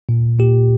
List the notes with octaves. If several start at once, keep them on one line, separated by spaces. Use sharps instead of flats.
A#2
A#2 G4